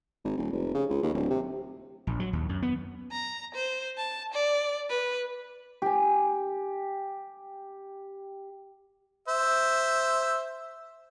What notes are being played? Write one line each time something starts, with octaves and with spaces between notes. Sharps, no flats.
G#1
D#1
F1
C#3
C#2
D#2
D1
C3
A#1
F#3
D#2
F#2
B3
A#5
C5
A5
D5
B4
G4 G#5
C5 E5